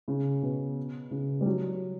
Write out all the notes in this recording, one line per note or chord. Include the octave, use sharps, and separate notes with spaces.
C#3
B2
C#3
G3
F#3